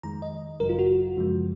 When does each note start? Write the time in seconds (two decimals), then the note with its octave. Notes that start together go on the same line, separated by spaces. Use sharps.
0.03 F2 D#3 G#3 A#5
0.22 D#5
0.60 G#1 F#2 C#3 F#3 A#4
0.69 F4
0.79 F#4
1.16 F#2 C#3 F3 G#3